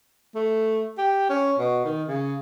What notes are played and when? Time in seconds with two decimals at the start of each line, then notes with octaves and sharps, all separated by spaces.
0.35 A3
0.98 G4
1.30 C#4
1.59 B2
1.85 D#3
2.08 C#3